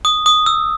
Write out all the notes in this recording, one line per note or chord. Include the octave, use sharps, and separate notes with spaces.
D#6
D#6
E6